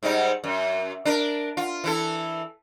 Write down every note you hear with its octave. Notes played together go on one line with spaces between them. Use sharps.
G#2 G3 D#4
F#2
D4 A#4
F4
E3 E4 A4